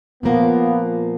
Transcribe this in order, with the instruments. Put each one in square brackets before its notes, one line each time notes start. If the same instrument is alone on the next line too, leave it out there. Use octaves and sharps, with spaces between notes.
[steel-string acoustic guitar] A#2 F3 A#3 [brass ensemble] B3